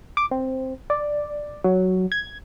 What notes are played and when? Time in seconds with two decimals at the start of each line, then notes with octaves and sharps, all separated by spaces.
0.17 D6
0.31 C4
0.90 D5
1.64 F#3
2.12 G#6